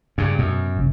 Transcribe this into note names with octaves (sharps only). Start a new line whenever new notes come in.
G2 C#3
F#2 B2
G1 C2 C#3